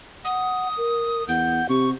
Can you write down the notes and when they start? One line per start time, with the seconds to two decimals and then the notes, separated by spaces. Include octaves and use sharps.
0.25 F#5 D#6
0.77 A#4
1.28 E2 F#5 G6
1.69 C3 G4 C#6